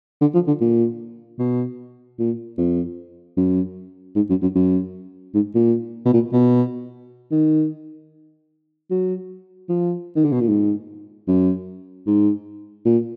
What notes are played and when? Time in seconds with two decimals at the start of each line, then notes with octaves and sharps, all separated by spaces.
0.21 D3
0.34 F3
0.47 D3
0.61 A#2
1.39 B2
2.19 A#2
2.58 F2
3.37 F#2
4.15 G#2
4.29 F#2
4.42 F#2
4.55 F#2
5.34 G#2
5.55 A#2
6.06 B2
6.13 A#2
6.33 B2
7.31 D#3
8.91 F#3
9.69 F3
10.16 D#3
10.24 D3
10.32 B2
10.41 A#2
10.48 G#2
11.28 F#2
12.07 G#2
12.85 A#2